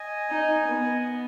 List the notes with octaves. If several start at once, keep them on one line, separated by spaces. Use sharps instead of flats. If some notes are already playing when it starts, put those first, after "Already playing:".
Already playing: D#5 G#5
D#4
B3